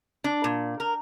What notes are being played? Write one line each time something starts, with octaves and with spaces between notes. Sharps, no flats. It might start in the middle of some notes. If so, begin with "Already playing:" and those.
D4
A#2
A#4